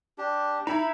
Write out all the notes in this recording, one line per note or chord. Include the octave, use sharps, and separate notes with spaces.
D4 G4
D#4 E4 A#5 B5